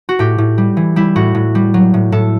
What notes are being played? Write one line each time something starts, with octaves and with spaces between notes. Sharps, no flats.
F#4
A2 G4
A2
G3
E3
G3 E4
A2 F#4
A2
G3
F#3
A2
A2 A4